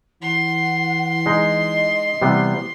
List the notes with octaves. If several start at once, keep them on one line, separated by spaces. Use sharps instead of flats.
E3 F#5 C6
G#3 D#4 D#5
C3 E3 G3 B3 C4